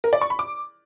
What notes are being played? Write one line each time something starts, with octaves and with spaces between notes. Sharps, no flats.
A#4
D5
C#6
B5
D6